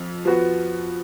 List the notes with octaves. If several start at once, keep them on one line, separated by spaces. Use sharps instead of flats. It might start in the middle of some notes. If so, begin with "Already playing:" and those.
Already playing: F2
F3 B3 F#4